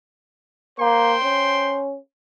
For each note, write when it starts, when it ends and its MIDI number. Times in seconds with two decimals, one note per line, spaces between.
0.80 1.16 58
0.80 1.86 72
0.80 1.86 79
0.80 1.86 84
1.23 1.97 61